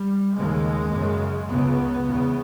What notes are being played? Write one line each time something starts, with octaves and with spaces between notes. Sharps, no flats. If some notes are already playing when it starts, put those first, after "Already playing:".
Already playing: G3
D#2 C#3 G#3
F#2 C#3
C#2 C#3 B3
E2 C#3